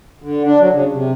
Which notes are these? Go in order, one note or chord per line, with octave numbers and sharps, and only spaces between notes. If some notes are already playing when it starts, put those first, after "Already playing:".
D3
D4
F#3
C#3
C3